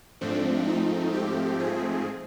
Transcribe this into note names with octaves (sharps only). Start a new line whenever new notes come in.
G#2 F3 A3 C4 D4
D#4
G4
G#4